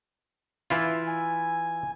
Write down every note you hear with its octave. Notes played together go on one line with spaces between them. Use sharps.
E3 E4 F4
G#5